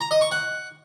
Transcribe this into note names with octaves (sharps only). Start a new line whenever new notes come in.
A#5
D#5
C#6
F#5